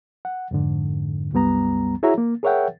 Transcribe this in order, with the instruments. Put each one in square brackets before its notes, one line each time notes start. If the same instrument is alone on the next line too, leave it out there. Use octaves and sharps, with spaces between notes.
[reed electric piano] F#5
F2 G#2 D3
C2 F#2 G3 B3 A#5
E4 F#4 G#4 C#5 E5 A#5
A#3
G#4 A#4 C#5 E5 F#5 G5